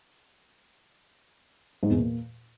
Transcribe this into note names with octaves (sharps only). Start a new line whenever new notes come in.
G#2
E2
A#2